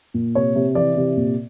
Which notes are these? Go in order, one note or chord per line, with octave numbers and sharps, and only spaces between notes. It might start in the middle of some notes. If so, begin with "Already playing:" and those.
A#2
C3 C#5
C3
E3 D5
C3
A#2